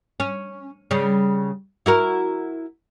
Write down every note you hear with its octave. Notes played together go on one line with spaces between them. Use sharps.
C#4
C#3 G3
E4 F#4 A#4